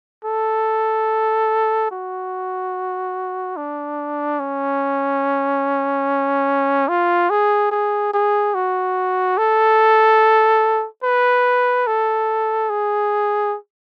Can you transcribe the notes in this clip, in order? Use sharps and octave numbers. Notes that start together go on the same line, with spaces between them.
A4
F#4
D4
C#4
F4
G#4
G#4
G#4
F#4
A4
B4
A4
G#4